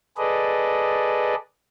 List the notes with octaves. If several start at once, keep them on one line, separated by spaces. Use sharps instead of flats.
G#4 A4 B4 D5 D#5